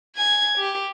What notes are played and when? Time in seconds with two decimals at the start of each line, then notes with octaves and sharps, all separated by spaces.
0.16 G#5 G#6
0.58 G4